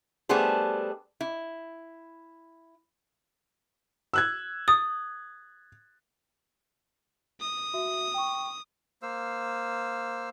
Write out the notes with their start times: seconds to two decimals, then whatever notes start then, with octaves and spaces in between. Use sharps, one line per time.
0.29 G3 A3 B3 D4 G#4 C5
1.21 E4
4.13 E6 F#6 G#6
4.68 D#6 A6
7.40 D#6
7.74 F#4 E5
8.14 G5 C#6
9.02 A#3 C5 F5 E6